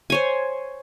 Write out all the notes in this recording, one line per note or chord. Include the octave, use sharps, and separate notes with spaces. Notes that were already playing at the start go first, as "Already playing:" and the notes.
C5 C#5 G#5